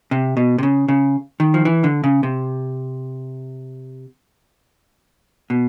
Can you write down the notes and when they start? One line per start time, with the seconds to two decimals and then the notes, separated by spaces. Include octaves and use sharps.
0.11 C3
0.37 B2
0.58 C3
0.63 C#3
0.88 C#3
1.40 D#3
1.54 F3
1.65 E3
1.84 D3
2.04 C#3
2.23 C3
5.50 B2